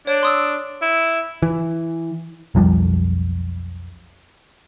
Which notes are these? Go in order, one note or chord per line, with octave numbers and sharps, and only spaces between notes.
D4 C#5
C6 D#6 E6
E4
E3
B1 F2 F3 G3